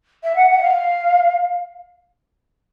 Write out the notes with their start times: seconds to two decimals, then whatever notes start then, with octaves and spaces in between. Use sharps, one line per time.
0.24 E5
0.36 F#5
0.50 F#5
0.58 E5
0.62 F5